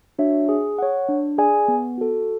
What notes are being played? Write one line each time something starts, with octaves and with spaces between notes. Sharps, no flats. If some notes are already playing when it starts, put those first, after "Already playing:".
D4 F#4 C#5 E5
G#4
C#5 F#5
D4
G#4 D5 G#5
B3
F#4 A4